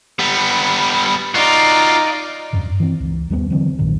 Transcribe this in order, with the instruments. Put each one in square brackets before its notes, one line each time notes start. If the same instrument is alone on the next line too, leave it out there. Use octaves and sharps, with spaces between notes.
[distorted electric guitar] G3 B3
[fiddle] D#4 D5 [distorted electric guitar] F4 F#4
[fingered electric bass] E2 G2
E3 C4
C#2 E3
D#2 G3 G#3 B3
D3 E3 F#3 C4
B1 G2 A#2 D#3